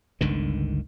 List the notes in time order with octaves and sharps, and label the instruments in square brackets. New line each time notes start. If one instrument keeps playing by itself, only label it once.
[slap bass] G1 C#2 D3 D#3